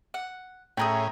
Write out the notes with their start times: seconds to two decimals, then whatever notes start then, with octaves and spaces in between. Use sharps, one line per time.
0.14 F#5
0.77 A2 A3 C#4 D4 G#4 G5 A#5 D#6